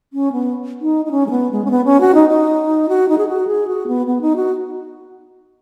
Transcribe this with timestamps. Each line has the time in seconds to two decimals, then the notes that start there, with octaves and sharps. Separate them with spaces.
0.13 C#4
0.32 B3
0.81 D#4
1.05 D#4
1.11 C#4
1.26 G#3
1.31 B3
1.51 G#3
1.65 C#4
1.71 B3
1.85 C#4
2.01 F#4
2.15 D#4
2.29 D#4
2.89 F#4
3.09 D#4
3.18 G#4
3.28 F#4
3.47 G#4
3.68 F#4
3.87 B3
4.07 B3
4.21 D#4
4.36 F#4